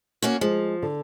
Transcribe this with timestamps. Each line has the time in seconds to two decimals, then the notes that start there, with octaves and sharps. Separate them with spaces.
0.22 A#3 C#4 F#4
0.41 F3 G#3
0.82 D3